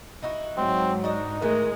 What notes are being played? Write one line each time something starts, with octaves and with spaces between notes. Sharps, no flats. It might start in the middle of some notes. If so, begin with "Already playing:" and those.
D#4 E4 F#4
G#2 F#3 C4
D4 D#4 F#4 D#5
A2 D#3 E3 G#3 A#4